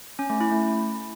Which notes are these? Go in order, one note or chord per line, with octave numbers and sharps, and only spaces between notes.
C#4
A3
E4
A3